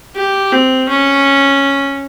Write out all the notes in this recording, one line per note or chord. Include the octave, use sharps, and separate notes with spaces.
G4
C4
C#4